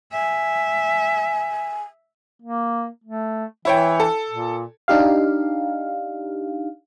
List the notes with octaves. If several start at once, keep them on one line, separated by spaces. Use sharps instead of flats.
E5 G#5
A#3
A3
E3 E4 C#5 G5
A4
A#2
D4 D#4 G4 F5